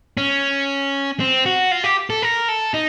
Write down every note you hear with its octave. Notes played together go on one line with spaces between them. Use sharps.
C#4
C4
F#4
F4
G4
A4
A#4
A4
D#4